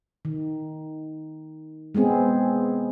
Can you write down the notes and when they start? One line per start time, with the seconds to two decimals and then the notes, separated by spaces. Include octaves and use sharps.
0.25 D#3
1.95 G#3 B3 C4 G#4